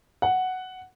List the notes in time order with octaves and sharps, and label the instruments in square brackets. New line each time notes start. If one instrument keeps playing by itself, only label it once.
[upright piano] F#5